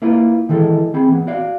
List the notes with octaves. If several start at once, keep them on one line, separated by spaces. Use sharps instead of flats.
A#3 E4 F4 B4
D#3 E3 G#3 A4
C4 G#4 B5
E3 B3
F#4 D5 F5